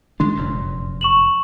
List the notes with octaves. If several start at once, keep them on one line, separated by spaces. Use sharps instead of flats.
D#3 G#3 D4 C6
F1 F#2 A#2
C#6 E7 F#7